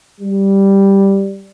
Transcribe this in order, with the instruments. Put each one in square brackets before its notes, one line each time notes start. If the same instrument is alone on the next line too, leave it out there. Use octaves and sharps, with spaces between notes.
[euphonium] G3